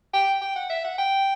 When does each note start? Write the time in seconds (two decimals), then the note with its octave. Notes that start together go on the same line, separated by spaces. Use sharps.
0.14 G5
0.42 G5
0.56 F#5
0.70 E5
0.85 F#5
0.99 G5